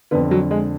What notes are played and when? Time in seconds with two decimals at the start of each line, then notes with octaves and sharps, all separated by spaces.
0.11 F2 D3 B3
0.31 F#3
0.51 G#3